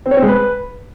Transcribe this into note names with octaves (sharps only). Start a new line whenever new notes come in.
C4
C#5
C4
G#3
B4